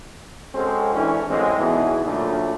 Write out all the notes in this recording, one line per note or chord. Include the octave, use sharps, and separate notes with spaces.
G#3 C4 C#4 F#4 A4
E3 G#3 C#4 D4 A4
A1 F#2 G#3 C4
E2 B2 E3 D#4 G#4
D2 A#2 C#3 F#3 A3